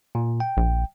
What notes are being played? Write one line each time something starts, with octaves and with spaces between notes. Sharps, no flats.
A#2
G5
A#1